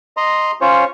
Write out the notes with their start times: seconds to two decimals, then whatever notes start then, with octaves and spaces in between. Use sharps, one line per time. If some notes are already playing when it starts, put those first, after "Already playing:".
0.17 D#5 A#5 C6
0.61 C#4 F4 C5 C#5